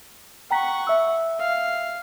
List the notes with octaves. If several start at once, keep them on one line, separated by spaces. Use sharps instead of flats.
F#5 G5 A#5 C#6 B6
E5 E6
F5